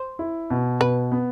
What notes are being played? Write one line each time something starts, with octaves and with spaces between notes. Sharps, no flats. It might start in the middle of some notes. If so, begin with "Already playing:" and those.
Already playing: C5
E4
B2
B2 B4
B3